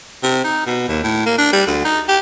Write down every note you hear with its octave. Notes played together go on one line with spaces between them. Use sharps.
C3
D#4
B2
D#2
A2
A#3
D4
G3
D2
D#4
G4